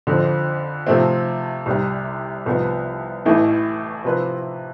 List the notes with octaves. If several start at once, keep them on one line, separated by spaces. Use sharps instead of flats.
F2 D3 F3 C4
C3 F3 A3 C4
C2 C3 G3
C2 C3 F3 B3
A1 A2 E3 A3
C3 F3 C4 G4 B4